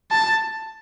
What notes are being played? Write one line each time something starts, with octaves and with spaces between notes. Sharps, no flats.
A5